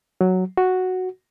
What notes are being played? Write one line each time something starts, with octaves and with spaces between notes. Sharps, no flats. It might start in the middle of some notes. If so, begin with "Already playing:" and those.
F#3
F#4